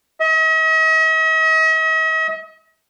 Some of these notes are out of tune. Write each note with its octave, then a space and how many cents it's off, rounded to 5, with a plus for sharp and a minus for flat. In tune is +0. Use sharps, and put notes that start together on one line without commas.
D#5 +45